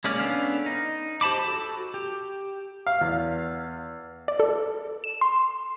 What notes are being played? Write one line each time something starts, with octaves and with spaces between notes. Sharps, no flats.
G#3 A#3 C#4 D5 F6
B3 C#4 D4 A4 F5
D#4
G4 C5 A5 B5 D6
F#4 A4
G4
F5
E2
D5
A4
E7
C6